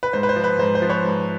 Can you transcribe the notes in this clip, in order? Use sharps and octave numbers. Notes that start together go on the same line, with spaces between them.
B4
G#2 C5
B4
C5
F3
B4
G#2 C5
C5
F3
B4 C#5
G#2